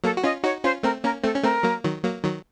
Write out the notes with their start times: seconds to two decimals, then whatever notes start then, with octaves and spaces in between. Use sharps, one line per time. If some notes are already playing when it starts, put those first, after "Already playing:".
0.04 F#3 A#3 A4
0.17 F#4
0.24 C#4 F4 D#5
0.44 D#4 F#4 C#5
0.64 C#4 F4 C5
0.83 A3 C4 A#4
1.04 A#3 C#4 A#4
1.24 A3 C4 A4
1.36 C#4
1.44 A3 C4 A#4
1.63 F#3 A#3
1.84 D#3 F#3
2.04 F#3 A#3
2.24 D#3 F#3